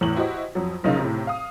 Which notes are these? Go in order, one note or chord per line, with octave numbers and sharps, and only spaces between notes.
E2 A2 C#5 F#7
E4 F#4 G4 C5 D#5
F2 F#3
F1 B1 C#3 D#4 A#4 F5
A2 C3
F5 D#6